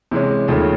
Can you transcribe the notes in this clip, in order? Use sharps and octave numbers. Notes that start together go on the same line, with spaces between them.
C3 E3 G#3 C#4
D#2 C#3 F3 A3 C#4